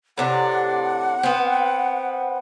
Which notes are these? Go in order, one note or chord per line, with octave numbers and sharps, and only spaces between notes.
A2 C3 D4 F#5
B3 C4